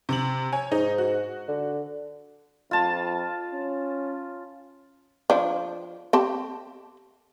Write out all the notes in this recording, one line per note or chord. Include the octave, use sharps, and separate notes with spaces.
C3 F#7
C#5 G#5
G#2 D#4
F#4
D3
F2 F4 A5
C#4
F3 D4
C4 G4 A5